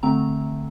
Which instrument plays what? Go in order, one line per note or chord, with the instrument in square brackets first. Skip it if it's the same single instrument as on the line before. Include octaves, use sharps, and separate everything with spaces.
[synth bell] D3 A3 C4 A#5